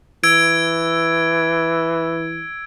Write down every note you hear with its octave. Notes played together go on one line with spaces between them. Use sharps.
E3 E6 G#6 D7